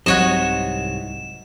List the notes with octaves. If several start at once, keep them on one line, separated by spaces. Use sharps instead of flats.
C2 G#2 C3 F#3 F#4 C#5 D#5 E7